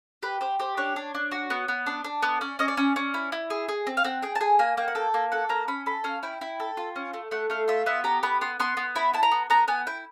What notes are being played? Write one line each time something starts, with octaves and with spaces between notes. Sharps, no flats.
G4 B4
G4 C5
G4 C5
D4 C#5
D4
D4
F#4
B3
B3
D4
D4
B3
C#4 D5
C#4 D#5
D5
C#4
C#4
E4
E4
G#4
G#4
C4
F5
C4 F#5
G#4 G5
A5
G#4 G#5
A#3 G#5
A#3 G5
F#5
A4 G5
A#3
A4 F#5
A#3 A#5
C#4 B5
A4 B5
C#4 F5
E4 G5
E4
A4
F4
C#4
A3
A3 F#5
A3 F5
F4 E5
B3 E5
G4 A#5
B3 B5
B3 C6
B3 C6
B3
E4 B5
E4 A5
A#5
B3
B3 A#5
B3 G#5
E4 G5